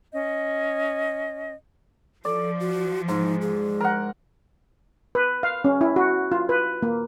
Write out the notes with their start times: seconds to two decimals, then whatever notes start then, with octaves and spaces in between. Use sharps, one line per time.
0.13 C#4 D#5
2.25 F3 A4 D5
2.60 F#4
3.08 G#2 D#4
3.42 G#4
3.80 A#4 F#5
5.15 B4
5.43 F5
5.65 C#4
5.81 E4
5.96 F#4
6.32 F4
6.49 B4
6.83 A#3